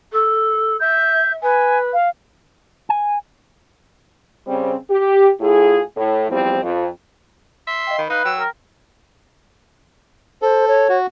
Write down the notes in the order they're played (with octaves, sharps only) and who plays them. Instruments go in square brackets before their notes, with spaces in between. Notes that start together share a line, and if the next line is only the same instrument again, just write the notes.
[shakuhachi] A4
[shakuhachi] E5 [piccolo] G6
[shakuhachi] B4 [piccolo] G#5
[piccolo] F5
[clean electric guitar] G#5
[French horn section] C#3 G3 C4
G4
A2 E4 F4 G#4
A2
E2 E3 F3 G3 C4
F2
[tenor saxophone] E5 [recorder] C6
[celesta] D#5 F5 G5
[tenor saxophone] D#3 [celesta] B5
[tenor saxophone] D#4 [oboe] B4 [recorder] F5
[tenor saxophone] F#3 [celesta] G5 [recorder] E6
[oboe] A#4
[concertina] A4 [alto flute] C5
[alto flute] C#5
[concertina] F#4